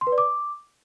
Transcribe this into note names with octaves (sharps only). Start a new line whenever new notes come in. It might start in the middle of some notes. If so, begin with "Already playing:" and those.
C6
B4
D5
D6